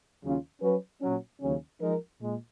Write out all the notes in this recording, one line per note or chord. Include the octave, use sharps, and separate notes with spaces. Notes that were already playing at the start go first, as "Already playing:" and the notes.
D#2 C#3 F#3 C#4 F4
F#3 C#4 F#4 B4
A#2 F#3 C#4
D#2 C#3 F#3 C#4
F3 G#3 D#4 A#4
A#2 G#3